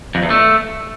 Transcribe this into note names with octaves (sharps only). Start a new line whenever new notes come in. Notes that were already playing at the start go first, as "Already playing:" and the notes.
F2
E2
A3